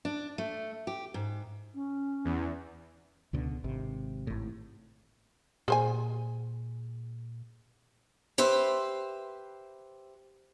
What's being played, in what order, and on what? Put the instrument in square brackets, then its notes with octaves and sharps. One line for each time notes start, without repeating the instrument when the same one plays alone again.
[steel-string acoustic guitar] D4
A3
G4
G#2
[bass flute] C#4
[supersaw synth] E2
[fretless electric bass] C#2 B2 D3
G#1 C3
G#1 A2
[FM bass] A#2 [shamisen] G#4 C5 G#5
[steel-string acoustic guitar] G4 B4 C5 E5